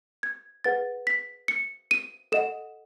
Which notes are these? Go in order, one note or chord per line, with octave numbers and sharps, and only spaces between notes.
G#6
G#4 B4 F#5 A6
B6
C#7
D#7
A4 D#5 F#5 E7